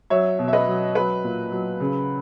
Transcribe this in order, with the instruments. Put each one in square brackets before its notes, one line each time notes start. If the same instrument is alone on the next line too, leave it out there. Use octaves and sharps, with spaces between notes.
[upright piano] F#3 C#5 E5
B2
E5
B4 D#5
F#3
F#3 B4
A#2
F#3
C#3